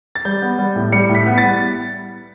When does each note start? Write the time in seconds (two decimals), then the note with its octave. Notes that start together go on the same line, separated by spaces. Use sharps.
0.15 A6
0.25 G3 G6
0.42 B3
0.59 G3
0.76 A2
0.92 G3 C#7
1.09 A2
1.15 B6
1.26 B3
1.38 A6
1.43 G3